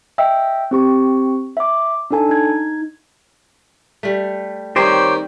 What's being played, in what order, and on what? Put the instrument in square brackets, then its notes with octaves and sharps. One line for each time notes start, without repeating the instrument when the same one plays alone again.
[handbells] D#5 E5 G5 E6
C4 G4 C#6
E5 D6
D4 D#4 A4 G#5 A5
D#4 G#6
[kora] G3 A3
[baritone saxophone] D#3 [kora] G3 C4 D#5 [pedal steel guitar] G4 C5 C#5